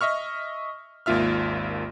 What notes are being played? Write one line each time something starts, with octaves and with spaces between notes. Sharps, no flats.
D#5 E5 C#6 F6
G#1 D#2 A#3 F4 E5 F6